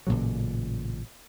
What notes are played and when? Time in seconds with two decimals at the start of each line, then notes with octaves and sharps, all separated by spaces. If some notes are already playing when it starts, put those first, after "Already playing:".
0.07 A1 A#2 C#3 F#3